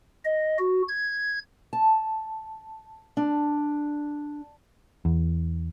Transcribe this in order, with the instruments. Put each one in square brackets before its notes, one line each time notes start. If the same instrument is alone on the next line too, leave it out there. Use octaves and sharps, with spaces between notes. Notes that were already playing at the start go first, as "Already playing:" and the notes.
[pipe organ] D#5
F#4
G#6
[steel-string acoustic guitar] A5
D4
[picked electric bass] E2